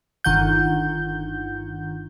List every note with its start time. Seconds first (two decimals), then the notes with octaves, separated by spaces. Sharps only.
0.24 G1 D#3 F#5 G6